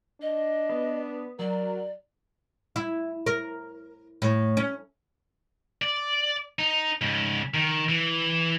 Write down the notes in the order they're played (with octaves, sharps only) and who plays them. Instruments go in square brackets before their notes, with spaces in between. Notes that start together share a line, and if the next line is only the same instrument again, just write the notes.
[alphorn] D4 [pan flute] D#5
[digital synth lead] B3
[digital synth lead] F#3 [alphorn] A#4 [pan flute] D5
[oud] E4
A#4
A2
C#4
[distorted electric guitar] D5
D#4
G#2 C#3
D#3
E3